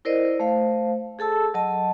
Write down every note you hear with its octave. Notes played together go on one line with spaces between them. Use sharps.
E4 A#4 C5 D5 D#5
A3 C5 F5
G#4 A4 A5 E6
F#3 D#5 A5